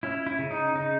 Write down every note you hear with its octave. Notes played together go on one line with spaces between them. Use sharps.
C#4 E4
E4
C#3
D#4
C#3 D#4